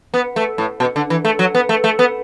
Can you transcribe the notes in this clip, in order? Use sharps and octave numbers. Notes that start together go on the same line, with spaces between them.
B3
A3
A2
B2
D3
E3
A3
F#3
B3
A3
A3
B3